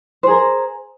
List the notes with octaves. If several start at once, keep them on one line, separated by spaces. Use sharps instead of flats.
G#4 A#4 C5